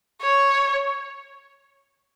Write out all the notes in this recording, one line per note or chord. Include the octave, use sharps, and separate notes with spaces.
C#5